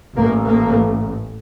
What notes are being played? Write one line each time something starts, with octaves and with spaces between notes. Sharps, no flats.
A1 A2 A#3
A#3